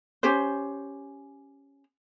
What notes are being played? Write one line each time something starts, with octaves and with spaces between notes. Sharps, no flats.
C#4 G4 C5